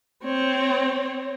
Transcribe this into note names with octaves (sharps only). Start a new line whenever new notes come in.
C4 C#5